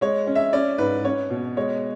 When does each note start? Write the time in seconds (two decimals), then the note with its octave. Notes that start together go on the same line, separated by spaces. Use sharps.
0.01 G#3 C#5
0.27 C#4
0.35 E5
0.53 C#4 D5
0.78 G#2 B4
1.05 C#4 C#5
1.30 B2
1.57 G#3 C#5